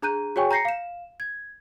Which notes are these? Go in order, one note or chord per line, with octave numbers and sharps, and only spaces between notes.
D4 G#4 A#5 F#6 G6 D#7
F#4 G#4 C#5 G5 G#5 C#6
A#5 G6 A#6 C7 C#7
F5 E7
G#6